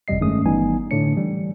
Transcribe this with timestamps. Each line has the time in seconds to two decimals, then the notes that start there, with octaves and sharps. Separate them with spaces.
0.08 G1 F2 C3 G3 D#5 C7
0.21 G2 D#3 G#3 A3 C#4 D#6
0.45 G1 E3 G3 B3 D#4 G#5
0.91 A2 D3 A3 D4 C#5 C#7
1.16 E3 G3